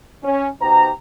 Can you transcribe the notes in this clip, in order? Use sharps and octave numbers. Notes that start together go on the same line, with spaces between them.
C#4
B2 D#4 G4 C5 A#5